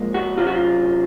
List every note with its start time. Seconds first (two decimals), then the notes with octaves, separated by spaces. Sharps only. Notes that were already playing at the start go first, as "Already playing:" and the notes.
Already playing: A#2 F3 G#3
0.14 F#4
0.37 C3 F#3 C#4 F4
0.47 F#4
0.55 F4